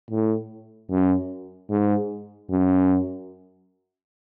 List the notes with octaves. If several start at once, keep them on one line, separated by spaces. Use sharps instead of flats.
A2
F#2
G#2
F#2